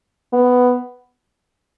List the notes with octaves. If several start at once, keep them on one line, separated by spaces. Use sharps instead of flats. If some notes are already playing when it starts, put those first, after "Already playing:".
B3